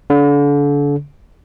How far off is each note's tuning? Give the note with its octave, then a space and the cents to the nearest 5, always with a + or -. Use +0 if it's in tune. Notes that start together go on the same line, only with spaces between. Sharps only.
D3 -35